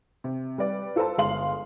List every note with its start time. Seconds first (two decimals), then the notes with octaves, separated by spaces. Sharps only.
0.24 C3
0.58 G3 B4 D5
0.96 F4 A4 B4 C5 A5
1.18 G1 G#3 F5 C6 F#7